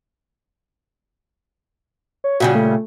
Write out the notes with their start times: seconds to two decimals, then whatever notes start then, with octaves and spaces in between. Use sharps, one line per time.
2.24 C#5
2.40 A#2 C#3 G3 F#4
2.55 A3